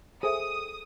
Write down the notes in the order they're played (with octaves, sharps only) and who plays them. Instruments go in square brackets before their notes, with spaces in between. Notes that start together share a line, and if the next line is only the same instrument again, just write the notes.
[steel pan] G#4 [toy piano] A4 G5 [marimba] C5 E5 [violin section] D#6